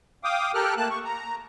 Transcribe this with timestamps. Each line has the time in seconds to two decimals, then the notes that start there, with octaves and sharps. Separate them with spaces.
0.24 F5 G5 D6 D#6
0.54 G4 A4 A#4 G5 F6 F#6
0.77 A3 A#3 A5 F#6
0.90 C#6
1.04 A#5